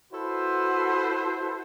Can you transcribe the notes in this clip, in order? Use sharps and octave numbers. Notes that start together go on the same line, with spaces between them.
E4 F#4 A4 B4 C5